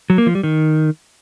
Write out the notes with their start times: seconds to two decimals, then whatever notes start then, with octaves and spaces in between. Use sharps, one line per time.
0.10 F#3
0.18 A#3
0.27 F3
0.35 G3
0.43 D#3